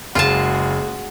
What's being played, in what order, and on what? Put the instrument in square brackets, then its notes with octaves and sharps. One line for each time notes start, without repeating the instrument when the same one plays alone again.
[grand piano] F#1 [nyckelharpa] G#3 F#4 [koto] F4 A5